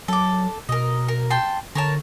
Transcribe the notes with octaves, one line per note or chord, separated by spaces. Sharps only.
F#3 A4 D6
B2 A#4 D#5
A#4
G5 A5 C6
D3 A#4 C#5 A5